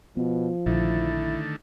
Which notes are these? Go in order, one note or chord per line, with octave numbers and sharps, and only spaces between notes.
B2 F3 B3
A#1 D3 D#3 A3 E4